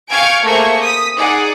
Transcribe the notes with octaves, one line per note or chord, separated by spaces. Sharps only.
F5 G5 G#5 C#6 G#6 D7
A3 A#3 G#4 C5 C#6 G#6
D#6 B6
D#4 G#4 D5 F#5 D6